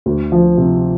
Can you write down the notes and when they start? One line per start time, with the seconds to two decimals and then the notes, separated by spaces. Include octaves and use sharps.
0.06 D2
0.32 F3
0.57 C3